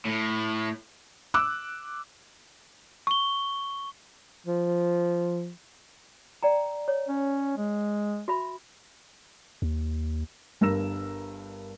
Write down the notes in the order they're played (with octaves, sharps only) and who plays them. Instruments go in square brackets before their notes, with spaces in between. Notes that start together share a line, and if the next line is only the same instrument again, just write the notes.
[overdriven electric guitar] A2
[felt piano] D6 E6 F#6
[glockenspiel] C#6 G7
[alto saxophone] F3
[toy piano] D5 G5 A#5
C#5
[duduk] C#4
G#3
[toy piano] F#4 E5 B5
[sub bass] D#2
[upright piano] G1 G2 A#4 E6 A#6 E7